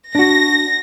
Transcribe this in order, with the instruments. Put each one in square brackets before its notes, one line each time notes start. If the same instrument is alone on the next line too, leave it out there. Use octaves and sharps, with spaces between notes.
[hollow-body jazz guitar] D4 F#4 [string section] A#6